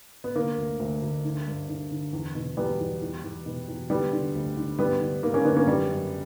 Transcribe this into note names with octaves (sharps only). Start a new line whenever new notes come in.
B3
D3 A#3
D2
D2
D2
D3
G2
D3
D3
E2
B2
E2 G3 B3
E2
E2
E2
B2
E2
D3 G3 B3
D3
D2
D3
G2 G3 B3
D3
D3 A#3
A#3 C#4
D3 B3 D4
A#3 C#4
F#2 G3 B3
F#2